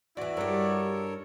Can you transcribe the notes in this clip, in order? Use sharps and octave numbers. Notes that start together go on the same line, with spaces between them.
E2 E3 E4 F#4 D5
G2 G4 A4 A#4 C#5